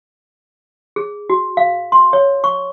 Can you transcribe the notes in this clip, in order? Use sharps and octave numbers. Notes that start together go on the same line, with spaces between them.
G#4
F#4
F5
C6
C#5
C#6